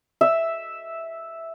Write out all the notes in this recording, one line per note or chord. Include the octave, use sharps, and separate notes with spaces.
E5